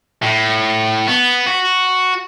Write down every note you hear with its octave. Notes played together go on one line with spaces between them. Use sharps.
A2
B3
F#4